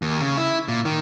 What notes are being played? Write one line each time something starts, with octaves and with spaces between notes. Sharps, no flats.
D#2
C#3
E4
A#2
D#3